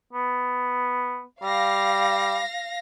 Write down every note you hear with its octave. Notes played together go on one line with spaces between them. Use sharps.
B3
G3 F5 A#6